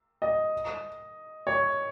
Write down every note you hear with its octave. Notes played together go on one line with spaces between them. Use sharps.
D#5
C#5